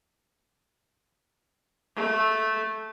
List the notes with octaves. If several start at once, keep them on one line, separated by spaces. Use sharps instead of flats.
A3